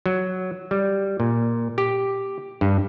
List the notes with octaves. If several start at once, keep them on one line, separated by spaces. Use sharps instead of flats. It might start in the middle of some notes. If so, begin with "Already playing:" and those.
F#3
G3
A#2
G4
G2